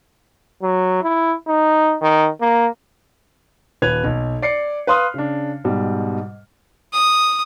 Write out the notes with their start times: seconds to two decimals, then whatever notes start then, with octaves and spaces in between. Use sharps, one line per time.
0.62 F#3
1.03 E4
1.47 D#4
2.02 D#3
2.41 A#3
3.82 D#1 B4 G#6 F7
4.04 B1
4.42 D5 C7 C#7
4.87 B4 F5 C6 D#6 F6
5.14 C#3 D4
5.65 G#2 B2 G3
6.93 D#6